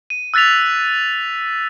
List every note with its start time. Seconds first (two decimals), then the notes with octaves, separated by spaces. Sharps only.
0.10 D#7
0.34 E6 F#6 A6 B6 F7